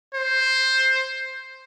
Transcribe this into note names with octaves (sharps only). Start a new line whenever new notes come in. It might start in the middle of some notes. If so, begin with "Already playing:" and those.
C5